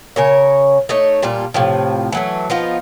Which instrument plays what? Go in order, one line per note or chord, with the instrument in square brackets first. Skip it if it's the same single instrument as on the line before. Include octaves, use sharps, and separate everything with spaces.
[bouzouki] C#3 A#4 C#5
A3 D#4 C#5
A#2 G3 D4 F4
A2 C3 F3
E3 F#3 A3
F3 B3 D#4 F4